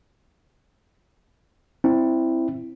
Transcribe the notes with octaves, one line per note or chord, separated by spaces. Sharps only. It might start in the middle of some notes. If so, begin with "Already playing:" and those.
C4 E4